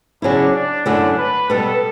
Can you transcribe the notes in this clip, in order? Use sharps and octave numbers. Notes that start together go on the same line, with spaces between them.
C#3 F#3 C#4 D4 E4
D4
F#2 D3 F#3 A3 D4 E4
B4
B2 G3 B3 A4